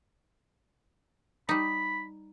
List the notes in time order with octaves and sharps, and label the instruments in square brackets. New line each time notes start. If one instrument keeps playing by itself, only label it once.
[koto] G3 D#4 [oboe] B5